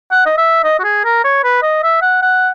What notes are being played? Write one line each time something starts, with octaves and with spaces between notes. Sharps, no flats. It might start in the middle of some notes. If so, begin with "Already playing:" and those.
F#5
D#5
E5
D#5
F#4
G#4
A#4
C#5
B4
D#5
E5
F#5
F#5